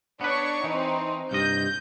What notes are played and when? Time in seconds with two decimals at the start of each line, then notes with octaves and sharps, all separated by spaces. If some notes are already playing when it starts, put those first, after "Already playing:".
0.21 B3 D4 B4 C#5 C#6
0.64 E3 C4 D#4
1.31 C2 G2 D#5 G6